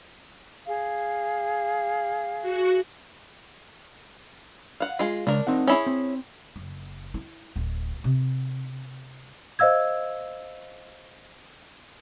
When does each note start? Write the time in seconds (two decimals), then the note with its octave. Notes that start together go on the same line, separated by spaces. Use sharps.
0.66 G#4 F5
2.42 F#4
4.80 F5 F#5
4.99 G#3 F4
5.27 C#3 G#3 D4 A#4
5.47 C4 D#4 F#5
5.68 C#4 E4 G#4
5.86 C4
6.56 F#1
7.14 E4
7.56 D1
8.04 C3
9.59 C5 D#5 F5 E6 G#6